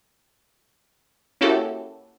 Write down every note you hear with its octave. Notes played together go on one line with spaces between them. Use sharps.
A#3 C#4 E4 F#4 G4 A4